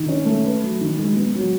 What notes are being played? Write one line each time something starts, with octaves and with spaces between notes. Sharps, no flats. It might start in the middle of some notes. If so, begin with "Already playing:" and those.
Already playing: D#3
C#4
A3
B4
F#3
D#3
G#3
B3
F#3